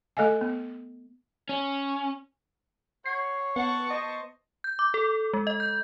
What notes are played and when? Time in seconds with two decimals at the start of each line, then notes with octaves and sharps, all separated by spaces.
0.17 A3 A4 D#5 F5 G#5
0.41 B3
1.49 C#4
3.06 C#5 F#5 C7
3.56 B3 F#5 A5 C#6
3.90 C5 D#5
4.64 G6
4.79 D6
4.94 A4
5.34 G#3
5.47 D#5
5.60 G6